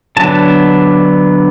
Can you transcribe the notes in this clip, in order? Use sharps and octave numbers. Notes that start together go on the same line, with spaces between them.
D3 F#3 B3 D4 A5